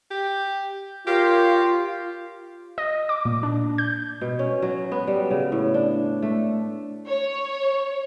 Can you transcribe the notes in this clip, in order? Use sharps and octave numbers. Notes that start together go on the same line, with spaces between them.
G4
F4 G4 A#4 C#5 F5
D#5
D6
A#2
D4
G6
B2
C#4
F#3
B3
G3
C#3
A2
D4
A3
C#5